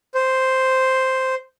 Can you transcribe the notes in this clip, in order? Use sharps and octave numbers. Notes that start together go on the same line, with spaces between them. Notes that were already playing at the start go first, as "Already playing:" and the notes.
C5